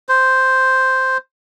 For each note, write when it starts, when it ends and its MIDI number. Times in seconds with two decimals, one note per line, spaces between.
0.09 1.17 72